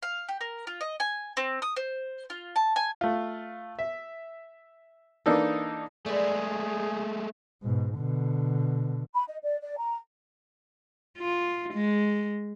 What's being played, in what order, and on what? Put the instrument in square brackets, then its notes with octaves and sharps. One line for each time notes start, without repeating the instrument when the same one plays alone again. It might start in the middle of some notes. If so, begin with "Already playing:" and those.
[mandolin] F5
G4
A#4
F4
D#5
G#5
C4
D#6
C5
F4
A5
G#5
[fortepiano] A3 F4
E5
E3 A#3 D4 D#4 A4
[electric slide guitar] G#3 A3 [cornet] G#4 [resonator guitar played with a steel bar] B4 D5
[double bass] G#2 B2
B2 D3
[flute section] B5
D#5
D5
D5
A#5
[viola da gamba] F4
G#3